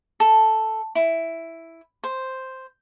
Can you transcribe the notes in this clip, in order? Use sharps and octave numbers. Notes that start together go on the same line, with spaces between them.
A4
E4
C5